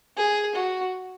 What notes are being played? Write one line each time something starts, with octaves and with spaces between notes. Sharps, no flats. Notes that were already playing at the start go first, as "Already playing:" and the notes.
G#4
F#4